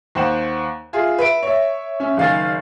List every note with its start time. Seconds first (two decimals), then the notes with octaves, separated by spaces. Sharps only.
0.15 D#2 C5 F#5 E7
0.93 F4 G#4 E5
1.18 B4 E5 D7
1.43 C#5 E5
2.00 C#4 E5
2.17 F#1 D#3 F5 G#5 A6